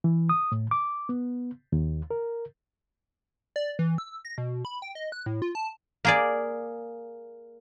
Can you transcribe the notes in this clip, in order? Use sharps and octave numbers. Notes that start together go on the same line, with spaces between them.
E3
D#6
A2
D6
B3
D#2
A#4
D5
E3
E6
A#6
B2
B5
G5
D#5
F#6
A2
F4
A5
A#3 G#4 D5